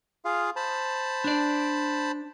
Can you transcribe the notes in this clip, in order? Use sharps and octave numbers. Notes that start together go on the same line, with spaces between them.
F4 G#4 F5
C5 A5 B5
D4 D5